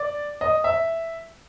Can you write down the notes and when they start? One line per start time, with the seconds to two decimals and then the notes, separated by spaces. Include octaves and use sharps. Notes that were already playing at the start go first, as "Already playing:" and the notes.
Already playing: D5
0.41 D#5
0.64 E5